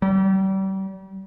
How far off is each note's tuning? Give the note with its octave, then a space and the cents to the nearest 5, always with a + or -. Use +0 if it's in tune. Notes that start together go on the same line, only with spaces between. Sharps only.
G3 -35